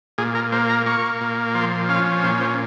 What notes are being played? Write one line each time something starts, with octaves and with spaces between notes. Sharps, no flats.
A#2 G#4
A#4
A#3 C5
A#5
A#3 C#6
A#2
F3 C6
C#4 F5
A#2 C5
C5